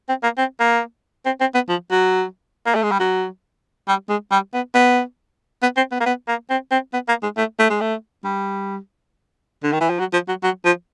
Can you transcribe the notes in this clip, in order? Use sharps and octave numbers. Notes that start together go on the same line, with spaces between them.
C4
A#3
C4
A#3
C4
C4
B3
F3
F#3
A#3
A3
G#3
G3
F#3
G3
G#3
G3
B3
B3
B3
C4
B3
A#3
B3
A#3
C4
C4
B3
A#3
G#3
A3
A3
G#3
A3
G3
D3
D#3
E3
F3
F#3
F3
F#3
F#3
F3